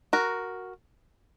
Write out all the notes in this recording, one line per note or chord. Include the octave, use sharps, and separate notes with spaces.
F#4 A#4